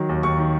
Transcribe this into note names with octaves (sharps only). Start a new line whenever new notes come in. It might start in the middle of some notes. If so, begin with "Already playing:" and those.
Already playing: D#3 F#3
D#2
D#2 C#6
D#3